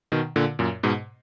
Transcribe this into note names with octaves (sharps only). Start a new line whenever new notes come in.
B2 D#3
A#2 D3
F#2 A#2
G#2 B2